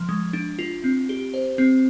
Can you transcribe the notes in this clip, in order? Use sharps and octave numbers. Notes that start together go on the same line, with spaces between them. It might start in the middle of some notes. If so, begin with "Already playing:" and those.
Already playing: F3
G#3
D4
F4
C4
G4
C5
C4